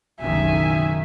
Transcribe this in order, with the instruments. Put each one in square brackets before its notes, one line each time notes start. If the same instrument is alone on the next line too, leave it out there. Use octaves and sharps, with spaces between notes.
[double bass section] F#1 B1 D#3 [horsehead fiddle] E5 G#5